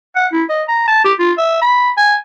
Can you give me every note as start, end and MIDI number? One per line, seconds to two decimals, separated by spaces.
0.16 0.27 78
0.32 0.44 64
0.49 0.63 75
0.68 0.83 82
0.88 1.04 81
1.05 1.13 67
1.19 1.32 65
1.38 1.58 76
1.62 1.90 83
1.98 2.16 80